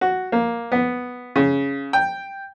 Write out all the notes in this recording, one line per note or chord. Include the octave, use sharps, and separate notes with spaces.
F#4
A#3
B3
C#3
G5